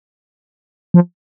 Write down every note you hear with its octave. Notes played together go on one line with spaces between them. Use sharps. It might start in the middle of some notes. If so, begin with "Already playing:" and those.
F3